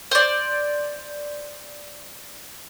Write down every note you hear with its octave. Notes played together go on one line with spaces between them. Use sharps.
C5 D5